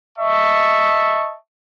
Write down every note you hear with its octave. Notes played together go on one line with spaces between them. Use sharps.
D#5 E5 A5 C#6